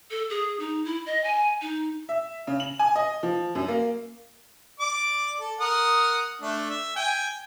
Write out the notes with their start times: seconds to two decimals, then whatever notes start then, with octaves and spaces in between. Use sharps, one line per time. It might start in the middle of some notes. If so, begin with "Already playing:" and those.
0.11 A4
0.30 G#4
0.60 D#4
0.85 E4
1.06 D#5
1.24 G#5
1.61 D#4
2.09 E5
2.47 C#3
2.60 F#7
2.79 G#5
2.96 D#5
3.23 F3
3.55 F#2
3.68 A#3
4.80 D5 D6
5.40 A4
5.60 A#4 F#5 D#6
6.42 A3 D4
6.70 E5
6.96 G5 G#5